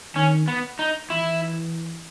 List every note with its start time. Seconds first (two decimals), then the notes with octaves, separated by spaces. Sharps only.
0.15 D#3 C#4
0.48 B3
0.79 D#4
1.10 E3 E4